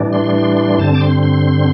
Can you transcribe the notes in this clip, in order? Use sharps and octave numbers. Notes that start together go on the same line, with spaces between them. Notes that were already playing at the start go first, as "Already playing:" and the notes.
Already playing: A2 E3 G3 D4
C6
C6
C6
G2 D3 C4 A5
D6
C6
C6